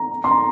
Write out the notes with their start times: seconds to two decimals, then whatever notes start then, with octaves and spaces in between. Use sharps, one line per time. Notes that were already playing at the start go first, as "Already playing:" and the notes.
Already playing: A#5
0.24 C6
0.31 A#5